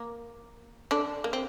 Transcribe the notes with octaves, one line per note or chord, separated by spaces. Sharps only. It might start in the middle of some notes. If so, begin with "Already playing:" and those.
Already playing: A#3 A#4
D3 D4
A#3
C4